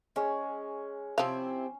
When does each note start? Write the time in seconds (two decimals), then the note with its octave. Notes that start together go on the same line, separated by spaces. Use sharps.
0.16 G#3 C#4
1.18 C3 F3 C4 E4 F5